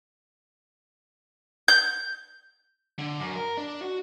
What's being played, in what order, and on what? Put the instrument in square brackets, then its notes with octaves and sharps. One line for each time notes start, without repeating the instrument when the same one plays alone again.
[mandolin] G6
[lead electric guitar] D3
F#2
A#4
D4
F#4